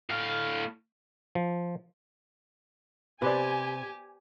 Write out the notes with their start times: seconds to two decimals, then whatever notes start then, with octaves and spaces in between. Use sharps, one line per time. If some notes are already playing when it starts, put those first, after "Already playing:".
0.10 A2 F5
1.35 F3
3.22 C3 G4 B4 C5 D5 G#5